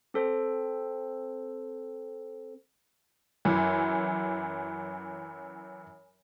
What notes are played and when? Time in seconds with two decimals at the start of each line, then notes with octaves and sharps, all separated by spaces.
0.14 C4 A4 C5
3.45 F#2 E3